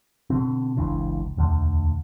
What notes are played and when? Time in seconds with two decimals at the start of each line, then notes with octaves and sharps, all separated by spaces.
0.30 B2 D3 C4
0.77 F#1 C#2 E3 D4
1.37 E1 D2 D3